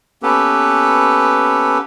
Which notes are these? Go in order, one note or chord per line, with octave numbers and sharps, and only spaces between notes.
A#3 B3 C#4 G4 A4 B4